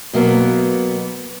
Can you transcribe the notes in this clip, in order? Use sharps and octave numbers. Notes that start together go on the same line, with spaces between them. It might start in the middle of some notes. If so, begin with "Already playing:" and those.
B2 F#3 A#3 B3